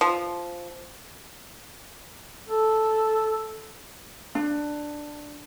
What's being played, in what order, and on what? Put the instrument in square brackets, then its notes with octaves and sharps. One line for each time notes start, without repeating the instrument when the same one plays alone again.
[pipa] F3
[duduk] A4
[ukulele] D4